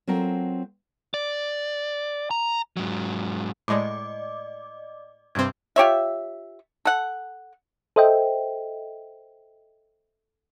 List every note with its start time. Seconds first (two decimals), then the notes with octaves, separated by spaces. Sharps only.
0.07 F#3 C4 F4 A4 A#4
1.14 D5
2.31 A#5
2.77 G#2 F#3
3.68 A2 G#3 D5 D#5 D6
5.35 G2 C3 C4 G#6
5.76 F4 G4 C#5 E5
6.85 A4 F#5
7.96 A4 C5 D#5 E5 G5